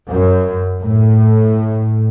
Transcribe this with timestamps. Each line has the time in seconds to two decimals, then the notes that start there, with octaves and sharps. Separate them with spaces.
0.10 F#2
0.83 A2